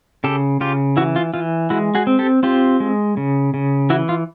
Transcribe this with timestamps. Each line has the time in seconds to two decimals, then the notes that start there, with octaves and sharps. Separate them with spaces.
0.24 C#3 G4 A4
0.61 C#3 F4 G4
0.97 E3 E4 F#4
1.16 F4
1.34 E3 F4
1.70 G#3 E4 F#4
1.95 F#4 G#4
2.07 C4
2.19 G4 A4
2.43 C4 F4 G4
2.80 G#3
3.17 C#3
3.54 C#3
3.90 E3 E4 F#4
4.09 F4